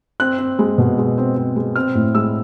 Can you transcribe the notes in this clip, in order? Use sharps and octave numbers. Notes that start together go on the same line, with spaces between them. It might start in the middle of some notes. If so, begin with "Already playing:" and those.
C4 F#6
C4
G#3
B2
G#3
C4
C4
G#3
C4 F6
A2
G#3 E6